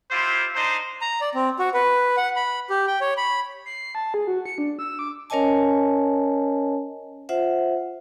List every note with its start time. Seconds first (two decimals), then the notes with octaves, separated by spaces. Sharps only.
0.11 E4 F4 G4 C5
0.55 D4 D#4 C5
1.01 A#5
1.21 D5
1.34 C4
1.59 F#4
1.74 B4
2.17 F#5
2.36 B5
2.70 G4
2.87 G5
3.01 C#5
3.17 B5
3.65 C7
3.95 A5
4.14 G#4
4.27 F#4
4.46 C#7
4.58 D4
4.79 E6
4.99 D6
5.30 C#4 A#4 C#5 D#5 G#5 A5
7.29 F4 C5 E5 F#5